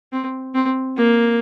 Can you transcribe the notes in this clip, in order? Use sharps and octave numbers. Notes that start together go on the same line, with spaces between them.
C4
C4
A#3